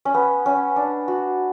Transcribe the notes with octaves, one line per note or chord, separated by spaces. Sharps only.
C#4
B3
C#4
D4
F#4